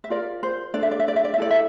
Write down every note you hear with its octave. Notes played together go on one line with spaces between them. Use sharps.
E5
F4 A#4 D5
C5
D4 A4 D5
E5
D5
E5
D5
E5
D5
E5
E4 A4 D5
E5